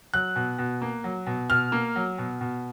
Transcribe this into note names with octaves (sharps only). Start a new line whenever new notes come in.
F#3 F#6
B2
B2
A#3
F#3
B2
B2 F6
A#3
F#3
B2
B2